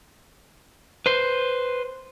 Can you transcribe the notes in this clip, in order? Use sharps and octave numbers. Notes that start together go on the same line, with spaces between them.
B4 C5